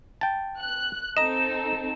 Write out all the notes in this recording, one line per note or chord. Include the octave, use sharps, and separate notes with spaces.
G5 A5
F#6
C4 D#4 A4 D#5 A#5 E7